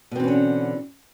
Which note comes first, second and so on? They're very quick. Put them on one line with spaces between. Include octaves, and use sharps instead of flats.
B2 C4 E3 C#4 D3